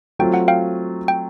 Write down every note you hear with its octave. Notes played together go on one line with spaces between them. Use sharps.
F#3 A3 C4 F4 G5
F#5
F5 G5
G5